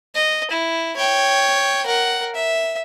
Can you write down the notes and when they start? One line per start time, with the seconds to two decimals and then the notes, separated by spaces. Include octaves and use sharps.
0.15 D#5
0.51 E4
0.97 C#5 G5
1.86 A#4 F#5
2.35 E5